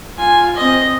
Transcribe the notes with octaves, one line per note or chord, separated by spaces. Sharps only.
F4 G#5
C4 D#5